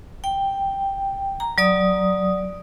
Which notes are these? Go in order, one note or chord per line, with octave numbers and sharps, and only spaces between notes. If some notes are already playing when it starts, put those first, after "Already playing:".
G5
A#5
F#3 D5 D#6